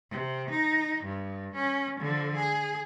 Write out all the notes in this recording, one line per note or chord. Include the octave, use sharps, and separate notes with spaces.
C3
D#4
G2
C#4
D3 F3
G#4